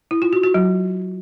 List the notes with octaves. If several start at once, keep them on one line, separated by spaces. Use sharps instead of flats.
E4
F4
F#4
F#4
F#3